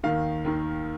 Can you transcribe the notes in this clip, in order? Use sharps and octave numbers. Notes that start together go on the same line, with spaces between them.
D#2 D#3 F5
D#2 D#3